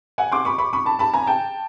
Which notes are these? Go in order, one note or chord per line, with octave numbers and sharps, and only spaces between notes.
F#5 G#5
C6 D6
B5 C#6
B5 C#6
B5 C#6
A5 B5
A5 B5
G#5 A#5
G5 A5